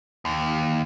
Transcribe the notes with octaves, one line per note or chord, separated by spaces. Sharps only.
D#2